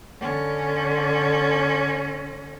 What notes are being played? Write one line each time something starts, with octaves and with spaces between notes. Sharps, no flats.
D3 C#4